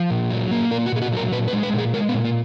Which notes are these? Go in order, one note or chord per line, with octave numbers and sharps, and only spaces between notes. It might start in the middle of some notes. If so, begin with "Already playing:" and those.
Already playing: F3
A#2
F#3
A#3
A#2 A#4
F#4
A#2 G#4
F#4
F#3 A#4
A#2 B4
B4
G#3
B4
A#2
G#4
G#3 A#4
B3
A#2
A#3